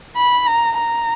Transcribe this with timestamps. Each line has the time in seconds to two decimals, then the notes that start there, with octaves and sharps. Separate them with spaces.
0.16 B5
0.47 A#5
0.77 A#5